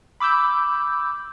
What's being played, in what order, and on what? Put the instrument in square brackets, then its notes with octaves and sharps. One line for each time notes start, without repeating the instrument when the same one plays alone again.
[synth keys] B5 D6 E6 G6